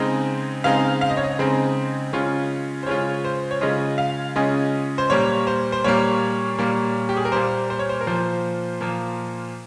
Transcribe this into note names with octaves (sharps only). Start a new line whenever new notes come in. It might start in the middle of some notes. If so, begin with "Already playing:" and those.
Already playing: C#3 G#3 C4 D#4
C#3 G#3 C4 D#4 F5
F5
D#5
C#5
D#5
C#3 G#3 C4 D#4
C#3 G#3 C#4 F4
C5
C#3 G#3 C#4 F4 C#5
C5
C#5
C#3 G#3 C#4 F4 D#5
F5
C#3 G#3 C#4 F4 D#5
C5
A#2 G3 A#3 C#5
C5
C5
A#2 G3 A#3 C#5
A#2 G3 A#3
G4
G#4
A#4
A#2 G3 A#3 C5
C5
C#5
C5
A#4
A#2 F3 A#3 C5
A#2 F3 A#3